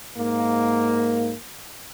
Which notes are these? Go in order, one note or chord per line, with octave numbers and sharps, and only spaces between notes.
G#2 A#3